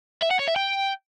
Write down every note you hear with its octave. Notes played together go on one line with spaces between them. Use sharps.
E5
F#5
C#5
E5
G5